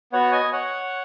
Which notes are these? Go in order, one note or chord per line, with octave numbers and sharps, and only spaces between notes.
B3 F#4 C#5 F#5
D#5 G#5
C#5 F#5